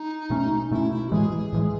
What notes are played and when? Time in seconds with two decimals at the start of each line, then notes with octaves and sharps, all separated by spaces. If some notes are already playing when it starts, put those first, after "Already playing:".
Already playing: D#4
0.30 B2 A3 C#4
0.71 B2 A3 C#4 E4
0.91 E4
1.07 F#4
1.12 A2 E3 G#3 G#4
1.53 A2 E3 G#3